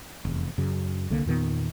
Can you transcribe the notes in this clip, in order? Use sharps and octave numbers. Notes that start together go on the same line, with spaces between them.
F1 E2
F#2 C#3
C2 D3 A#3
E2 A#2 D#3 B3